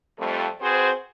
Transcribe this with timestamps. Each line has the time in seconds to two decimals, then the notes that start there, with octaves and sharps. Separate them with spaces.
0.19 F2 G3 A3
0.61 C4 F#4 G#4 B4 C5